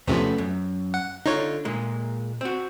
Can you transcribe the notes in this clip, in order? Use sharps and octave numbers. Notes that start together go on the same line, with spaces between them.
E2 C3 F3 A3 B3 C#4
F#2
F#5
D3 D#4 F4 C#5
A#2 G#3 A#3
C4 F#4